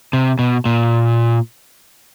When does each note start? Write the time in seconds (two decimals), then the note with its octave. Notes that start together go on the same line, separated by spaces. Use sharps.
0.13 C3
0.39 B2
0.65 A#2